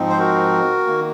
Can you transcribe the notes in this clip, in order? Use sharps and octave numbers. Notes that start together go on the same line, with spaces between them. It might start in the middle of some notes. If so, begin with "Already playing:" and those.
Already playing: G#2 F3 C4 D#4
C5
F#4 A#4
D#3 A#3